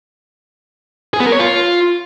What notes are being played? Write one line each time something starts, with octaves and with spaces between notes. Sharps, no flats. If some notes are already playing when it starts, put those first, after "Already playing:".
G#4
B3
A#4
C#5
F4